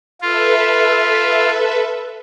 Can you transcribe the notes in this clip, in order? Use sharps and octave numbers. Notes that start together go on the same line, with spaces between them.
F4 A4 B4 E5